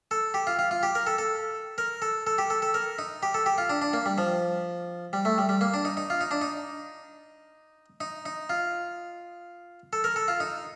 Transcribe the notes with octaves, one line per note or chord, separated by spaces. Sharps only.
A4
G4
F4
F4
F4
G4
A#4
A4
A4
A#4
A4
A4
G4
A4
A4
A#4
D#4
G4
A4
G4
F4
D4
D4
A#3
G3
F3
G3
A3
G3
G3
A#3
D4
D#4
D#4
F4
D#4
D4
D#4
D#4
D#4
F4
A4
A#4
A4
F4
D#4